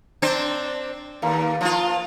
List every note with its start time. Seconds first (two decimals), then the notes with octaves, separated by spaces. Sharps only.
0.22 C4 D4 C5
1.22 D#2 A#3 B5
1.61 F3 F4